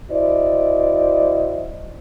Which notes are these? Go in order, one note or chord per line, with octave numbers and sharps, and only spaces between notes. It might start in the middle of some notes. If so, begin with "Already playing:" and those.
E4 F#4 C5 D5 D#5